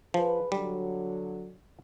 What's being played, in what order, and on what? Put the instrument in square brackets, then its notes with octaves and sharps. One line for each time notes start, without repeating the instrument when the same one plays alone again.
[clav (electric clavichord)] F3 [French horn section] G#4 B4
[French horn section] D3 F#3 [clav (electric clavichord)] G3